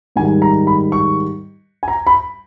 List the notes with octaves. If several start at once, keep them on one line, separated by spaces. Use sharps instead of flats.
G#2 D#3 G3 G#5
A#5
B5
C#6
G#5
A#5
B5